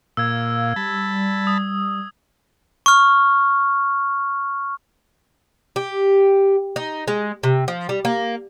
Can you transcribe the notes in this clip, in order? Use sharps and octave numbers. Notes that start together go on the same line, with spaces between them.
A#2 F5 E6 G#6
G3 A5 B5
D#6
C#6 F6
G4
D#4
G#3
C3
F3
G3
A#3